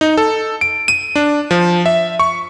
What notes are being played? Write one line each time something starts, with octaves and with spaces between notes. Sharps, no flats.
D#4
A4
D7
D#7
D4
F3
E5
C#6